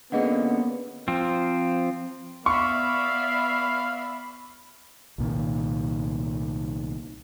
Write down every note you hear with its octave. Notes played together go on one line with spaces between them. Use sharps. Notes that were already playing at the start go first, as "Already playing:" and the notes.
D3 A#3 B3 C#4 G#4 D#5 F#5
F3 C4
B3 D5 E5 F5 B5 C#6
C2 A#2 D#3